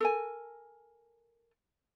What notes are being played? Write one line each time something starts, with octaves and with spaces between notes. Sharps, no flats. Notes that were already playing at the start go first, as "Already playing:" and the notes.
A4 A#4 G#5